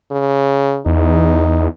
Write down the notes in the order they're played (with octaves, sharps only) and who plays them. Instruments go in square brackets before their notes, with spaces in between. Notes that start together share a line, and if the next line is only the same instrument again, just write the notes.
[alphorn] C#3
[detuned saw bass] E2 [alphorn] D#4